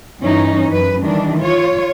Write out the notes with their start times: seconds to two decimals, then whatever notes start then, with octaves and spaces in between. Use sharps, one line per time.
0.21 G2 E3 C#4 D#4
0.69 F#2 B4
1.04 D#3 E3 G3 D4
1.40 F4 C#5